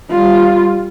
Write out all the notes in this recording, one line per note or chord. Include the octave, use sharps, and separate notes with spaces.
G3 F4